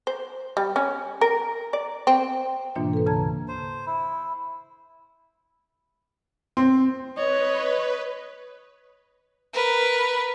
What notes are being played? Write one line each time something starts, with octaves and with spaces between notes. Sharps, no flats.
C5
G3
C#4
A#4
D5
C4
G#2 B2 E3 A#3 D4 F4
A4 B4
D2 C#3 A5 A#5 G#6
C5
E4
C4
B4 C#5 D#5
A#4 B4